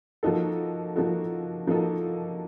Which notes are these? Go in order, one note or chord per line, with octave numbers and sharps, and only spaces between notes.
F3 A#3 D#4 F#4 A4
F3 A#3 D#4 F#4 A4
F3 A#3 D#4 F#4 A4